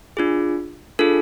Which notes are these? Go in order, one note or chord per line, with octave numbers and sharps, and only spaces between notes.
D4 F4 G#4
D4 F4 G#4 A4